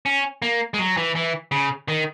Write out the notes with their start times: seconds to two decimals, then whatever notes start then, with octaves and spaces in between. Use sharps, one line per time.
0.06 C#4
0.42 A#3
0.74 G#3
0.78 F#3
0.97 E3
1.15 E3
1.52 C#3
1.88 D#3